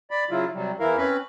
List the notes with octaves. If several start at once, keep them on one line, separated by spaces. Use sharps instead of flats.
D5 B5
C#3 F#3 E4 F4
C3 F#3 G3
E2 E3 E4 A#4 F5
C4 C#4 B4 B5